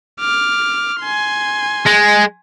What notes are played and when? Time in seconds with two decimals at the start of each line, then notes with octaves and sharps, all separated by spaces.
0.20 D6 F6
1.00 G#5 C6
1.87 G#3